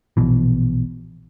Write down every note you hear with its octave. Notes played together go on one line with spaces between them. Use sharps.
A#1 B2 E3